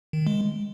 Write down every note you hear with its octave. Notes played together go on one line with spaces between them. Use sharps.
D#3
G#3